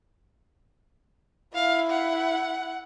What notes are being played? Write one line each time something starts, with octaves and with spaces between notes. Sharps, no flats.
E4 F5
F#5